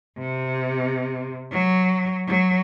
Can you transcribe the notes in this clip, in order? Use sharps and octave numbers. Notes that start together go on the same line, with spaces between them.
C3
F#3
F#3